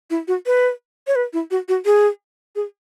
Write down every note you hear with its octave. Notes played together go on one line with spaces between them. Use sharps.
E4
F#4
B4
C#5
B4
E4
F#4
F#4
G#4
G#4